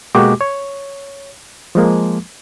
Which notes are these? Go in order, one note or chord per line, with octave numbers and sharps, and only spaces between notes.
B2 G#3 A#3 F#4 G4 D6
C#5
F3 G#3 A#3